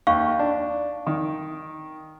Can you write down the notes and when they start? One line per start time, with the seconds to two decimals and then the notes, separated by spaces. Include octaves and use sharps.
0.07 D#2 F5 C#6
0.39 D4
1.07 D#3